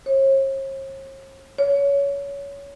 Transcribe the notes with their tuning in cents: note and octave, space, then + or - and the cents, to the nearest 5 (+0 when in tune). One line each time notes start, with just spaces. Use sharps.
C#5 -45
C#5 +20